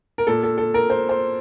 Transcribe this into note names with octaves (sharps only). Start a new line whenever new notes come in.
A#4
A#2 A4
A4
A4
A#4
C5
C5